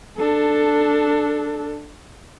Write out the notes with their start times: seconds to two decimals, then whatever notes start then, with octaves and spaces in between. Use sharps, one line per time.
0.18 D4 A4